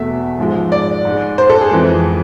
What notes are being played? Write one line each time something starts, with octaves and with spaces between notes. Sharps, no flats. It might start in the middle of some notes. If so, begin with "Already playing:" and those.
Already playing: E2 B2 A3 E5
G#2 F3 G#3
D5
G#2 G#3
C5
A4
G#4
F2 E3 G#3